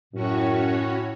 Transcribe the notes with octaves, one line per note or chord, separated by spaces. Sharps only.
F#2 A2 C#4 F#4 C#5